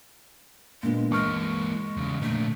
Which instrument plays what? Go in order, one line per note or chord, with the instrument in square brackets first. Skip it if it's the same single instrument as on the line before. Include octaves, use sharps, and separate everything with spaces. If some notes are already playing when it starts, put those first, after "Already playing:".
[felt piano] A#2 D3 B3 [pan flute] G#3
[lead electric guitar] E3 A#3 [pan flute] G#3 [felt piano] C#6 F6
[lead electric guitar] E2 C#3
[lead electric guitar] A#2 D3 [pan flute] A3